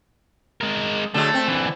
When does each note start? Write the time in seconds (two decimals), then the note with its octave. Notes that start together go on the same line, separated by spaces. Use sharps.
0.61 G#3 A#4
1.14 D3 F#3 G#3 A3
1.34 C4
1.47 D3 E3